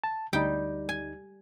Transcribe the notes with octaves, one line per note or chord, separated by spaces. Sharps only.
A5
D2 G3 D#4 G5
G#5